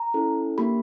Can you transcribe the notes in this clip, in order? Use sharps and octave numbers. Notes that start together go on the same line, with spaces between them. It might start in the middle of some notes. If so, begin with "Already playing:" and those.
Already playing: A#5
C#4 E4 A4
A#3 D4 G4 B5